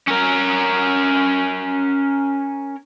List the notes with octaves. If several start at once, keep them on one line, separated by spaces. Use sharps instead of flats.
C#4 A#4